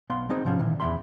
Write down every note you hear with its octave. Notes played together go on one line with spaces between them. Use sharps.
B1 B3 F5 C6
B3 C4 D#4 G#4 C5
G#2 C3 F3 B3 C#4
A#2 D#3 E3
E2 E3 F#3 E5 B5 C6